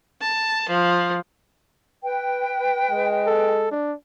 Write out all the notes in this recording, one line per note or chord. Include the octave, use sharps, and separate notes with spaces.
A5
F3
B4 G5
G#3
A4
D4